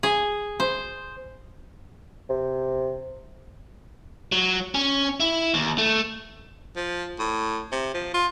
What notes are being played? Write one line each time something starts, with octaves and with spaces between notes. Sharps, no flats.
G#4
C5
C3
F#3
C#4
E4
D#2
A3
F3
A2
C3
F3
F4